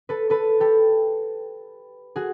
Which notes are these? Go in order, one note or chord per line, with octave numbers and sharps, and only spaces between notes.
A4 B4
A4 B4
G4 A4
F#4 G#4